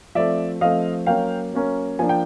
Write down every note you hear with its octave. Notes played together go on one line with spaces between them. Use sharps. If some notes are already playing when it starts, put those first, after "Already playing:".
F3 A3 C4 D5 E5
F3 A3 C4 D#5 F5
F#3 A#3 C#4 F5 G5
F#3 A#3 C#4
F3 A#3 D4 G#5
G5